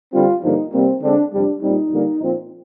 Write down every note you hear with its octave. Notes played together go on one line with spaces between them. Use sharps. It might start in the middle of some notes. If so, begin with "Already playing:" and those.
D3 G3 C4 F4
G2 D3 F3 A#3 D#4
C3 G3 A#3 C4
D3 G#3 C4 D4
F2 C3 G3 D4
A#2 G3 C4 D#4
F2 D3 G3 A#3
A#2 F3 C4